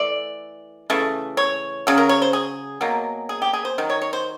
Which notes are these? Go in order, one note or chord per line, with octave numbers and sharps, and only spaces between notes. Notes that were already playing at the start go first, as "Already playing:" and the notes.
Already playing: E3 A3 D5
C#3 E3 A3
C#5
C#3 F#3
A#4
C#5
C5
G#4
B2 F#3 A#3
G#4
G4
G#4
C5
D#3 F#3
C#5
C#5
C5